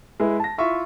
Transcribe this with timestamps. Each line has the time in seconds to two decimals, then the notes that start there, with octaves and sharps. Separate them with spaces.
0.20 G#3 E4 G#4 B4
0.40 A5 A#6
0.58 E4 F4 E5 C#6